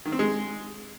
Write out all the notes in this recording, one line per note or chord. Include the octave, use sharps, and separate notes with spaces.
D#3
C4
G#3